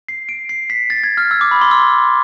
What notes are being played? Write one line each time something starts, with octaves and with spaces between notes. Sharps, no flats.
C7
D7
C7
B6
A6
G#6
F6
E6
D6
B5
C6
E6